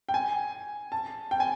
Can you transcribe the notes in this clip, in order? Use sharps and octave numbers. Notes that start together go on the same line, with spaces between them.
G5
G#5
A5
G5
G#5